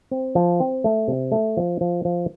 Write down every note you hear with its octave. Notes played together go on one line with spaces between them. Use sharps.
C4
F3
C4
A3
C3
A3
F3
F3
F3